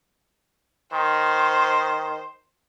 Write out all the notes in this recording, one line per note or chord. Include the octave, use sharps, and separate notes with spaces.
D#3 C5